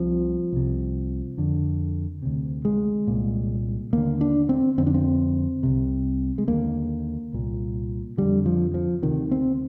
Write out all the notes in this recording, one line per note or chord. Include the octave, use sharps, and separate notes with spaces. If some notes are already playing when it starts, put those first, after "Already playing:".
Already playing: C2 C3 F3
C2 C3
F2 D3
D2 C3
G#3
C2 A#2
D#2 D3 A#3
D4
C4
F2 D3 C4
D4
C4
C2 C3
G#3
D#2 D3 A#3
C2 A#2
F2 D3 G3
F3
F3
D2 C3 D#3
C4